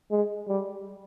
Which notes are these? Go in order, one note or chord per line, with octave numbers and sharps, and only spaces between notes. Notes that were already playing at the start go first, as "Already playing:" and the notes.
G#3
G3